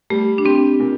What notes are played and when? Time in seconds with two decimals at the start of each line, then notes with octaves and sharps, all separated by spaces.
0.10 G3 A3
0.38 D4
0.45 C4 G4
0.80 A#2